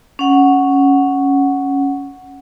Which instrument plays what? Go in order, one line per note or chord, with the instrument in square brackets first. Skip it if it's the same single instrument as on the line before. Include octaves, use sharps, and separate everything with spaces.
[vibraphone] C#4 F#5